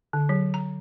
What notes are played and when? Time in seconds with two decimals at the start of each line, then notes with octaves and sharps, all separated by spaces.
0.13 D3
0.29 F#3
0.54 A#5